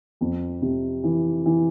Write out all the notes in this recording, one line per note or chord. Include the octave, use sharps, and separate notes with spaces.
F2
C3
E3
E3